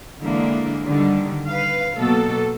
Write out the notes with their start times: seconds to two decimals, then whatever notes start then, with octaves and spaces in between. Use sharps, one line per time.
0.20 D3 E3 G#3 A#3 D4
0.86 D3 D#3 G3
1.48 B4 F5
1.96 B2 F#3 A#3 A4